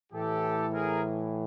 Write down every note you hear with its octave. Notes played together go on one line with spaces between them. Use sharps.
A2 E3 G4 A4
G#4 A#4